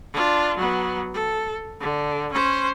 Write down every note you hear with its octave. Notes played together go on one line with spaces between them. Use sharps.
D4 F4
F#3 B3
A4
D3
C#4 C5